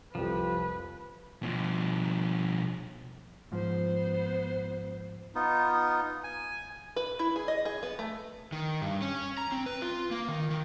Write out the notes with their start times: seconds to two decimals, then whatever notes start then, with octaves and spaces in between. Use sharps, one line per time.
0.15 C2 F2 F3 G4 B4
1.43 B2 F3
3.52 G#2 F3 B3 C5
5.35 B3 D#4 F4
6.24 G#5
6.96 B4
7.19 E4
7.36 G#4
7.48 D#5
7.65 G#4
7.83 B3
7.99 A3
8.52 D#3
8.82 G2
9.02 C#4
9.38 A#5
9.52 C4
9.66 B4
9.82 F4
10.11 A#3
10.28 D#3
10.50 D#3